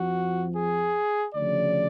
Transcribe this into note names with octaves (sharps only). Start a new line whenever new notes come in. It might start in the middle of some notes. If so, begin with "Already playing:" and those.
Already playing: F2 F3 F#4
G#4
D2 C#3 F3 D5